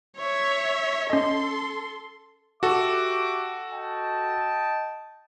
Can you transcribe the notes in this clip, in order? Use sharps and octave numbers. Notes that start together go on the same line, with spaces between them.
C#5 E5
C#4 A4 D#5 C6
F#4 G4 A4 E5 D6
D#5 G5 A5